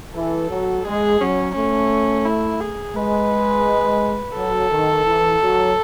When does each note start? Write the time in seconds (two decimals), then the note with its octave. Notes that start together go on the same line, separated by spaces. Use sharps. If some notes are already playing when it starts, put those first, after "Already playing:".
0.15 E3 A4
0.50 F#3
0.85 G#3 G#4
1.20 F#3 C#4
1.56 A3 C#4
2.26 E4
2.61 G#4
2.96 G#3 B4
4.36 F#3 A4
4.71 D#3
5.05 E3
5.41 F#3